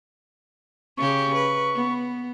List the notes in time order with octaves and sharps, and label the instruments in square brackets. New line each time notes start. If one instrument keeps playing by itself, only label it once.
[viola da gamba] C#3 G4 [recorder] C#6
[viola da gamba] B4
B3